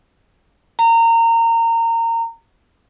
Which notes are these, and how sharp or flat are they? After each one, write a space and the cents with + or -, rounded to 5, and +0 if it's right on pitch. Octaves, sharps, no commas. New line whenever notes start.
A#5 -25